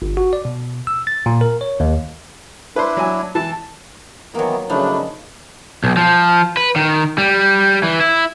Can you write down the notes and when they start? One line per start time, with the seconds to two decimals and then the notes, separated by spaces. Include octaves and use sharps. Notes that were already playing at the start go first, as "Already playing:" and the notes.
0.02 G1
0.17 F#4
0.33 D5
0.45 B2
0.87 E6
1.07 A6
1.26 A#2
1.41 A#4
1.61 C#5
1.80 D#2
2.76 D4 E4 B4 C5
2.97 F#3 G#5
3.35 E3 A5
4.35 D#3 E3 F#3 A#3 B3
4.70 C#3 F3 F#3 A3 D4 D#4 B5
5.84 B1
5.97 F3
6.57 B4
6.76 D#3
7.18 G3
7.83 E3
8.01 E4